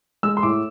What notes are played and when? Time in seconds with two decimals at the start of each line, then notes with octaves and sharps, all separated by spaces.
0.23 G#3 E6
0.37 C6
0.43 A2 D6